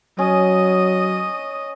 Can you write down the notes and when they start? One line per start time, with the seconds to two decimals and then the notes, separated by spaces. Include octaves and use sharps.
0.19 F#3 C#4 D#5 D#6